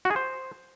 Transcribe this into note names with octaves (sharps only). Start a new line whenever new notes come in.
F#4
G#4
C5